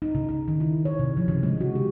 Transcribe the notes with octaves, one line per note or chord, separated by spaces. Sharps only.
D#4
C#3
D#4
D#3
E4
C#5
C3
F3
C#3
G#3
F#4
G4